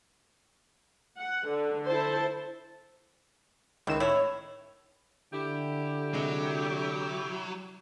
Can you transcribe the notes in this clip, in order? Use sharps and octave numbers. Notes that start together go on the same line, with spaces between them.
F#5
D3
E4 A4 C5 A5
C#2 D#3 E3 C4 E7
A2 E4 C#5
D3 E4 G4
C3 F#3 G#3 G#4